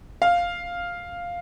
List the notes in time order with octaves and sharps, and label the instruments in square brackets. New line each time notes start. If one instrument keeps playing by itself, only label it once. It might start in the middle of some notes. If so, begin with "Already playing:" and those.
[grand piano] F5